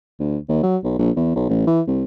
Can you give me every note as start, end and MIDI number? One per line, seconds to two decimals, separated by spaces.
0.20 0.37 38
0.49 0.58 39
0.63 0.77 54
0.84 0.98 35
0.99 1.11 34
1.16 1.32 40
1.35 1.46 35
1.49 1.66 33
1.67 1.81 52
1.87 2.04 36